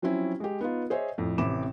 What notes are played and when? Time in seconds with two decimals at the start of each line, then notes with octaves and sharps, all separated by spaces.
0.02 F3 F#3 C4 C#4 E4
0.40 G#3 G4
0.61 B3 D#4 F4
0.90 G#4 C5 C#5 D#5 E5
1.18 F2 A2
1.38 A1 C3 B5 D6 E7